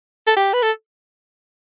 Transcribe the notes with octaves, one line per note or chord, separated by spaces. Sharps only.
A4
G4
B4
A4